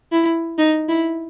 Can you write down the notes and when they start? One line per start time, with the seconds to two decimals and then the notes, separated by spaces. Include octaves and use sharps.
0.12 E4
0.58 D#4
0.89 E4